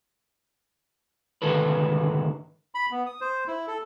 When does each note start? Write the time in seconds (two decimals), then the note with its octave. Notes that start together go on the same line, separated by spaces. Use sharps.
1.42 C2 G#2 D3 D#3 A4 B4
2.75 B5
2.91 B3
3.06 D#6
3.21 C5
3.47 E4
3.67 A4